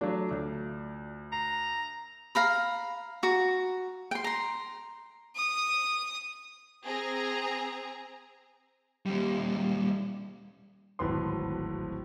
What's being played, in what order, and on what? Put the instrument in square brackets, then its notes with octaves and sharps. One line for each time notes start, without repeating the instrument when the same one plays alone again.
[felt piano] F#3 D4 [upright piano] A3 F4 D5
[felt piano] D2
[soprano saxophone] A#5 [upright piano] C7
[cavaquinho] F5 A#5 B5
F#4 A#5
G5 C6
A#5 C6
[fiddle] D#6
[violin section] C4 G#4 A#5
[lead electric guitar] D#2 G3
[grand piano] D1 G#1 A2 B4 C6